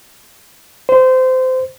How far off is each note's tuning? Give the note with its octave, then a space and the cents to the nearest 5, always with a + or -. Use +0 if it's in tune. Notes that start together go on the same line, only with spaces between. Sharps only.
C5 -25